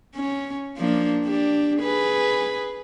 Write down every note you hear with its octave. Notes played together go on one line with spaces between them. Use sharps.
C#4
F3 A#3 D4
D4 G4
G#4 B4